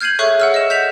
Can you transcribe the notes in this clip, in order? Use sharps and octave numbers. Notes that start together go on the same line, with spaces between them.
F6 G6 G#6 C7 D#7 F#7
G#4 A4 C#5 E5 C#6 F#6
F#5 E6 F6
D#5 E7
G6 B6 E7 F7